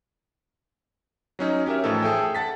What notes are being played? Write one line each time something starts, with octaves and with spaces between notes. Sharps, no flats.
F#3 C#4 D#4
C#4 G4 A#4 E5
A2 E3 F3 D#4 A4
G#4 A4 E5 G5
F#5 A5 A6 B6